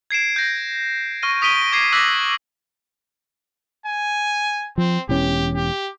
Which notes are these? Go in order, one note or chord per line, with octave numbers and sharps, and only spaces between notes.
G#6 C7 D7 E7
G6 A#6
C#6 F6 A#6 D#7
C#6 D#6 B6 D7 D#7 G7
D6 G#6 C7
D6 E6 F#6 A#6 B6 F#7
G#5
F3 C4
E1 E3 C#4 G4
G4